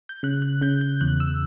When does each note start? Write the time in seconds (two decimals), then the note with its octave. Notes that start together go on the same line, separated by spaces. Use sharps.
0.09 G6
0.23 C#3 F#6
0.42 F#6
0.61 C#3 G6
0.81 G6
1.01 E2 F#6
1.20 E6